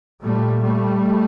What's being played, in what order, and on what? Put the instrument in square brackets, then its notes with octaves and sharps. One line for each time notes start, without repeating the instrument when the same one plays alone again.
[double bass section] A#2 G3 A3
G3 A3